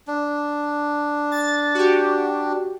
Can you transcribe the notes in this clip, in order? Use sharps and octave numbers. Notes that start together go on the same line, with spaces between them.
D4
A6
F#4 G4